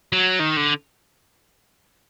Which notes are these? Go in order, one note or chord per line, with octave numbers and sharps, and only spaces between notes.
F#3
D#3
D3